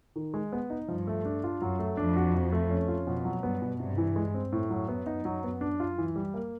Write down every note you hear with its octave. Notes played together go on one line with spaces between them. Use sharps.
D#3
G#3
B3
D#4
G2 F3
A3
D4
F4
F#2 F#3
A3
F2 D4
F#4
F3
A3
C#4
F4
F2 B2
F#3
G2 B3
B2
G2 C3
E3
G#3
C4
F#2 A2
F#3
B3
D#4
F#3
B3
D4
F4
E3
G3
A#3